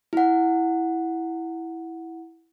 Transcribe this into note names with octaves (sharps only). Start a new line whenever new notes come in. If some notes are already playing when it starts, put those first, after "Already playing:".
E4 F#5